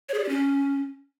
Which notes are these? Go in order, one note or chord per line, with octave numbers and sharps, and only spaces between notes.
C#5
G#4
D5
G4
C#4